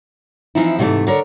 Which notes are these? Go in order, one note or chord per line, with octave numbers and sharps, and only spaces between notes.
E3 F3 C4 D#4 E4
G#2 C3 E3 G3 A3
D3 A#4 C#5